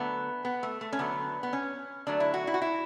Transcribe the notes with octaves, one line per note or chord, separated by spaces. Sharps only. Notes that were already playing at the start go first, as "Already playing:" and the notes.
Already playing: D3 F#3 A3 B3
B3
A3
A3
C#4
D3 F#3 A3 B3
B3
C#4
D3 F#3 A3 D4
E4
F#4
E4
F#4
E4